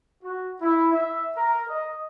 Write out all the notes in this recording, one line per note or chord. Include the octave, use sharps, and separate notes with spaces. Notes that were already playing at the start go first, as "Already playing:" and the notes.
F#4
E4
E5
A#4
D#5